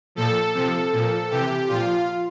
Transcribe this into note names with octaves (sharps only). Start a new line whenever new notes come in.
A#2 F3 A4
C3 F3 A4
A#2 F3
C3 E3 G4
A#2 F3 F4